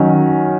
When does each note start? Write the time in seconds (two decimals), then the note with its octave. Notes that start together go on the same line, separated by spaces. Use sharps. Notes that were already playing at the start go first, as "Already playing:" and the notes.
Already playing: D#3 F#3 C#4